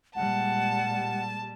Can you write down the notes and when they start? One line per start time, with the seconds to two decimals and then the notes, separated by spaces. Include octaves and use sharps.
0.16 A#2 G3 G#3 F#5 A5